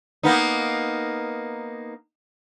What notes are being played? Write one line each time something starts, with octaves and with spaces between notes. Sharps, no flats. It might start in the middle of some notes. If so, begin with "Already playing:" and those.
A#3 B3 D#4